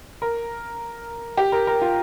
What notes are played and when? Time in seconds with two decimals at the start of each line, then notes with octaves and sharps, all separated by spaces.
0.22 A#4
1.37 G4
1.52 A#4
1.67 A#4
1.82 F4